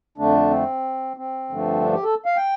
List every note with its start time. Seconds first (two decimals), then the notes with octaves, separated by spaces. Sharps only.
0.18 F2 D3 A3 D4
0.51 C4
1.17 C4
1.50 G2 D3 F3 A3
1.81 D4
1.93 G4
2.03 A4
2.25 F5
2.37 G5